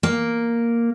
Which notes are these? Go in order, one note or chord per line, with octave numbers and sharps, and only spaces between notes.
A#3